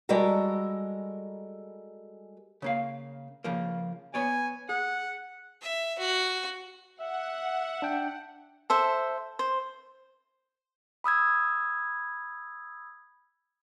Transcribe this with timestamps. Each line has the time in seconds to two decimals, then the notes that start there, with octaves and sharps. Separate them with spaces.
0.09 G3 G#3 F#4 A4 A#4
2.62 C#3 A#3 F5
3.44 C#3 F3 A#3
4.14 B3 C#5 D5 G#5
4.69 G#4 F#5
5.62 E5
5.98 F#4
7.00 E5 F#5
7.82 D4 G5
8.70 A4 C5 E5
9.39 C5
11.04 B5 D#6 E6 G#6